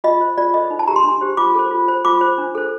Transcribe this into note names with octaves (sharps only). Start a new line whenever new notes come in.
F4 D#5
C5
F4 D5
A4 C5 D#5
D#4
A5
G4 A#4 A#5
C6
D4
G4 C5
F4 D6
A4 C5
F4
C5
F4 D6
C5
D4
A4 C5